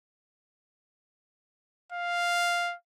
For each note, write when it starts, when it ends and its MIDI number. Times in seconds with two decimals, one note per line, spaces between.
1.92 2.75 77